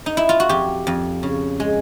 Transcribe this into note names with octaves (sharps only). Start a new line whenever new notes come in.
D#4
E4
F4
F#4
F2 G4
F2
C#3
G#3